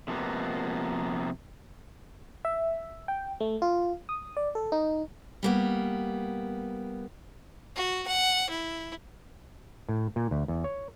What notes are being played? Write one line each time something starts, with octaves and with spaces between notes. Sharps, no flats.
C3 F3 A#3 B3
E5
G5
A3
F4
D#6
D5
A4
D#4
G3 A#3 B3
F#4
F#5
E4
A2
A#2
D2
E2
C#5